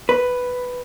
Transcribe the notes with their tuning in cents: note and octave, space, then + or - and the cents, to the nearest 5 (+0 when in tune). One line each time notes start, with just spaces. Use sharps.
B4 +5